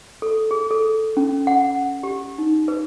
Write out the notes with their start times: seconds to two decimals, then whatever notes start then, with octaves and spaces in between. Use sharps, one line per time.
0.22 A4
0.51 G#4
0.71 A4
1.17 C#4
1.47 F#5
2.03 G4
2.38 D#4
2.68 B4